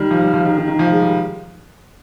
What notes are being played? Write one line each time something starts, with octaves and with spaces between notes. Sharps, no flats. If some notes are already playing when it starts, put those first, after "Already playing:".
Already playing: D#3 G3
F3
G3
F3
D#3
D#3
D#3
F3
G#3
G3